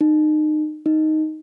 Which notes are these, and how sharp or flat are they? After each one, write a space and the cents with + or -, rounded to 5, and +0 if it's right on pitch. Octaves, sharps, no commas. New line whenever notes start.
D#4 -30
D#4 +0